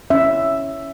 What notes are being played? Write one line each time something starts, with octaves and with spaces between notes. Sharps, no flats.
C#4 E5